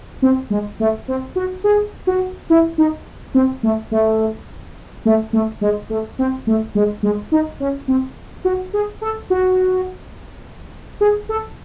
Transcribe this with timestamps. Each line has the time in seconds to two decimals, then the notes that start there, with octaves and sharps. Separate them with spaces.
0.22 C4
0.50 G#3
0.80 A3
1.08 C4
1.36 F#4
1.64 G#4
2.07 F#4
2.50 E4
2.78 D#4
3.35 C4
3.63 A3
3.91 A3
5.05 A3
5.33 A3
5.61 G#3
5.90 A3
6.19 C4
6.47 A3
6.75 G#3
7.03 G#3
7.32 D#4
7.60 C#4
7.88 C4
8.45 F#4
8.73 G#4
9.01 A4
9.30 F#4
11.01 G#4
11.29 A4